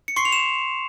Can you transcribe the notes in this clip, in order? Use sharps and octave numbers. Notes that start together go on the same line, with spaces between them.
C#7
C6 C#6 C7
F7
E7